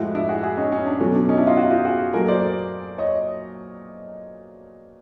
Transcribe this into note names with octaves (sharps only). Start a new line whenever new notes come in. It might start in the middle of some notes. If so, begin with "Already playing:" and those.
Already playing: A2 F3 G#3 E4 F#4
D4 E4
F#4 G#4
F#4 G#4
C#4 D#4
C#4
D4
B2 F#3 A3 C#4
D4
C#4 D#4
D4 E4
D#4 F4
E4 F#4
F4 G4
F#4 G#4
A#2 F#3 A3 G#4 A#4
C5 D5
C#5 D#5